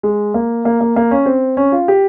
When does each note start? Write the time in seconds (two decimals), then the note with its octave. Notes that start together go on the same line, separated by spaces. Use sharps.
0.03 G#3
0.34 A#3
0.65 A#3
0.81 A#3
0.96 A#3
1.11 C#4
1.26 C4
1.57 C#4
1.72 F4
1.88 G4